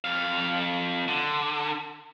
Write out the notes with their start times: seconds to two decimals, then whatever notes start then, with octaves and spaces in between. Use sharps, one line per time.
0.04 F2 F5
1.08 D3